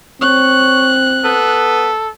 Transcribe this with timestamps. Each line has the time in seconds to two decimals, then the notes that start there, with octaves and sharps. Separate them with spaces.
0.22 C4 C#5 F#6
1.24 B3 A4